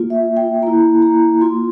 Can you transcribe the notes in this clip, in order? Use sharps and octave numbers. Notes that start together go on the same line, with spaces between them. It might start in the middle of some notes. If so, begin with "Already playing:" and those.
Already playing: A#3 F4
E5
G5
A#3 E4 A#5
A#5
A#3 F4 C6